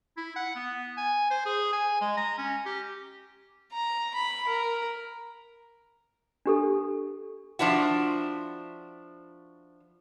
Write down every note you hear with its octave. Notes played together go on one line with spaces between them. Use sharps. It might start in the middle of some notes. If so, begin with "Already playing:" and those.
E4
F#5
B3
G#5
C5
G#4
G#5
G#3
A#5
C#4
G4
A#5
B5
A#4
D4 G4 A4
F3 D4 E4 F#4